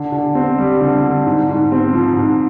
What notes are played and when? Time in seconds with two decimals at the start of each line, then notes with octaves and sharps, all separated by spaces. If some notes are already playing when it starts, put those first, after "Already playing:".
Already playing: D3
0.12 D3
0.35 C4
0.58 G3
0.81 D3
1.03 D3
1.26 G#2
1.49 G#2
1.72 C4
1.93 F3
2.17 G#2